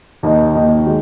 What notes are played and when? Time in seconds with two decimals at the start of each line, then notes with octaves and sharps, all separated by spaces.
0.23 D#2 D#3 A#3 D#4
0.55 D#2 D#3 A#3 D#4
0.86 G#3 F#4